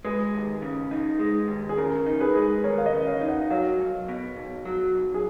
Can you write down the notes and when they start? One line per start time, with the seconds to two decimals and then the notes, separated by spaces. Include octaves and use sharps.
0.05 G#3 G#4 B4
0.34 D#2
0.62 C#3
0.91 D#4
1.19 G#3
1.48 D#2
1.69 G#4
1.77 C#3 A#4
2.06 D#4
2.20 G#4 B4
2.35 G#3
2.64 D#2 A#4 C#5
2.78 F5
2.85 B4 D#5
2.93 C#3
3.06 C#5 F5
3.21 D#4
3.28 D#5 F#5
3.50 F#3 C#5 F5
3.79 B1
4.08 B2
4.37 B1
4.65 F#3
4.95 B1
5.14 G#4